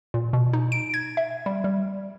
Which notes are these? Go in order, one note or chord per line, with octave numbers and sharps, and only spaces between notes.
A#2
B2
D#4
D7
G#6
E5
G3
G3